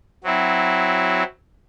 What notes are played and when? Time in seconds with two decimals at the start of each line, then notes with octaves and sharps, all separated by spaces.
0.23 F#3 C4 E4